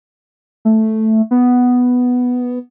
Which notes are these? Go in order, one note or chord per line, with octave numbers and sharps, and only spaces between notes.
A3
B3